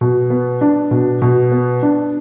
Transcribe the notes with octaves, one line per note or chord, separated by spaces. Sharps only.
B2
B3
D4
B2
B2
B3
D4